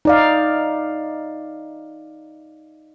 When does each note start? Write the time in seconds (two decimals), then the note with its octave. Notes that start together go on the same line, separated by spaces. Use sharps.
0.05 D#4 D5 F5